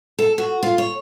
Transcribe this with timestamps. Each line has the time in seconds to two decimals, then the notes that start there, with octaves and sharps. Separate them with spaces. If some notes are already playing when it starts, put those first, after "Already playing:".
0.19 A4
0.38 F#4
0.63 F4
0.78 C#5